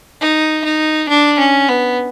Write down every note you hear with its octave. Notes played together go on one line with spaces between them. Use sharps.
D#4
D#4
D4
C#4
B3